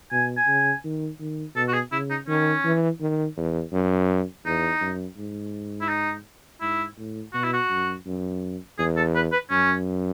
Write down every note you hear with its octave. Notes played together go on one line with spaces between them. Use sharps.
B2 G#5
G#5
C#3
D#3
D#3
B2 A4
F#4
G#4
C#3 E4
D#4
D#3 C#4
E3
D#3
E2
F#2
E2 D#4
F#2
G#2
E4
D#4
G#2 E4
A2
B2 F#4
E4
F#4
F#2
F#2
E2 G#4
A4
B4
B4
F#2 C#4